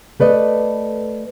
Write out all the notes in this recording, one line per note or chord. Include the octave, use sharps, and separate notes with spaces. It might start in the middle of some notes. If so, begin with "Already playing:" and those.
A3 B4 D5 D#5